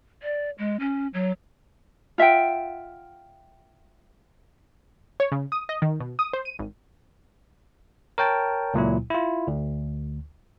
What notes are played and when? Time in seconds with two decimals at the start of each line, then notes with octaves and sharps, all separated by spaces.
0.22 D5
0.58 G#3
0.80 C#4
1.14 F#3
2.18 F4 E5 F#5 G5
5.20 C#5
5.32 C#3
5.52 D#6
5.69 D#5
5.82 D#3
6.00 B2
6.19 D#6
6.33 C5
6.45 D#7
6.59 G#1
8.18 A#4 C#5 G5 A5
8.74 C#2 A#2 F#3 E4
9.10 E4 F4
9.47 D2